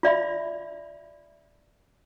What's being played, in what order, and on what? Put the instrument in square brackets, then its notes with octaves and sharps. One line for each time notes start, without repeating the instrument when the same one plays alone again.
[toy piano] F4 D5 E5 B5